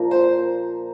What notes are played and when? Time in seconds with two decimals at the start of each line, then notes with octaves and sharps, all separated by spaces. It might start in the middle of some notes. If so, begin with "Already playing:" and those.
Already playing: A#2 F3 A#3
0.11 C5